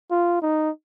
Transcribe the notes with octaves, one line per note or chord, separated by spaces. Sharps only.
F4
D#4